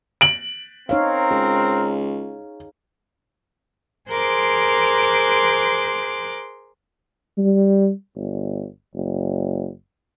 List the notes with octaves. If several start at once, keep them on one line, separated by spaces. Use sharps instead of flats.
D7 F#7
C4 D#4 A#4 C#5 F5
C#2 G#4
G#4 A#4 C5 C6 D6 F#6
G3
G1
F#1